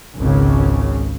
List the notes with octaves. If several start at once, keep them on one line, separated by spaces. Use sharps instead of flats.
G#1 C#2 C#3